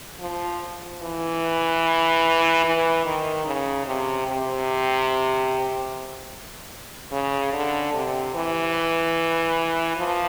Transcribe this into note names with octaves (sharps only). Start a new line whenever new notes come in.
F3
E3
E3
D#3
C#3
C3
C3
C#3
D3
C3
E3
F3